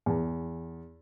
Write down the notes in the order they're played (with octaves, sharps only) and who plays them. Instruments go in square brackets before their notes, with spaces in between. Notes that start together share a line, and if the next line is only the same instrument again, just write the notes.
[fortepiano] E2